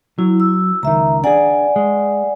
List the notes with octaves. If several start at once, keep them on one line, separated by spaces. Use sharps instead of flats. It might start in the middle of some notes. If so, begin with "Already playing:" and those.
F#3 E4
E6
C#2 D#3 E5 A#5
D4 G#4 D5 F#5 G#5
G#3